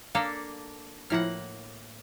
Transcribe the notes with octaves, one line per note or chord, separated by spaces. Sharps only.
A#3 D4 A4 F5 A#5 F6
A2 F3 A#3 E4 F#5 F6